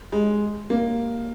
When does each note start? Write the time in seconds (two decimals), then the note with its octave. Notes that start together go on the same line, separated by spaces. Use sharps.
0.12 G#3
0.70 A#3